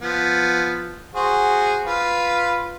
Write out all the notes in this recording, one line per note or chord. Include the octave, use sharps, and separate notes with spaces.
F3 B3
F#4 G#4 C5
F4 B4 F5